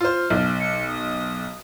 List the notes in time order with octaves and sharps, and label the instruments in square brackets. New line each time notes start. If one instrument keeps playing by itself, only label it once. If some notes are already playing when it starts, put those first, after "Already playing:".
[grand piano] F4 C5 [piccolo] F6
[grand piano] B1
[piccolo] C#7
D#6